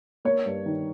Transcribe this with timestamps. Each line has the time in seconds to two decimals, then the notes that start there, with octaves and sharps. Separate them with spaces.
0.25 A#3 C#5
0.46 G2
0.66 D#3